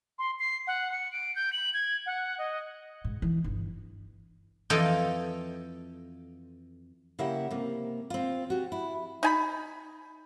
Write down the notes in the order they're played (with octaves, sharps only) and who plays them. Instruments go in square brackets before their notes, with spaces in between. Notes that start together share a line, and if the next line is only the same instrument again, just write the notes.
[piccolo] C6
C7
F#5
C#7
D7
G6
F#7
G#6
F#5
D#5
[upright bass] G#2
E3
G1
[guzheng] F2 E3 F4 A4 D#5 G5
[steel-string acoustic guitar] C#3 A#3 E4 G4 E5 F#5
C3 A#3
C4 F4
F#4 G4
E4
[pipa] D#4 G#5 B5